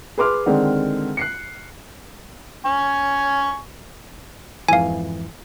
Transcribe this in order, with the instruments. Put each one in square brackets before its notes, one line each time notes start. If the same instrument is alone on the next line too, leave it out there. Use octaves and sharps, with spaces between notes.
[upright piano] G#4 B4 C6 D6 F6
D3 D#3 G#3 C4
F#6 C7 C#7
[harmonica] G#5 C#6
[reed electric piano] F2 G#2 E3 [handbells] F5 G#5